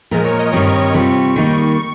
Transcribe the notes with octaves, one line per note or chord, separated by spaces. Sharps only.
A#2 F3 G#3 A#4
C#5
D#5
G2 D#3 G3 C4 C#6
C3 G3 C4 F4
D#3 G3 A#3 D#4
C#6